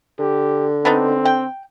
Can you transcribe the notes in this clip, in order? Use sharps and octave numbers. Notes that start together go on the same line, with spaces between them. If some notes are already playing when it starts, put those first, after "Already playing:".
D3 G4
B3 C4 D4 D#4
G5